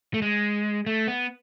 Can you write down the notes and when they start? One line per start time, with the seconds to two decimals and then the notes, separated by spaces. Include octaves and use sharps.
0.14 A3
0.22 G#3
0.86 A3
1.08 B3